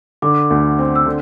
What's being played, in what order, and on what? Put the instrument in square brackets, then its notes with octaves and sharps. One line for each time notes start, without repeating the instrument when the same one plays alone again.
[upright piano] D3 [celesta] D6
[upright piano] D2
C4
[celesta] E6
[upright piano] D3